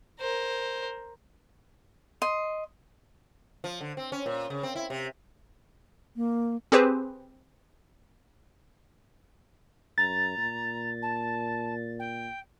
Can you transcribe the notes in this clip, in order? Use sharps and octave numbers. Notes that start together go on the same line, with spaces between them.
A#4 C5
D#5 C6
F3
D3
C4
C#4
A#2
C#3
C4
E4
C3
A#3
C4 G4 G#4 B4 C5
F#2 A#5 A6
A#2
A5
G5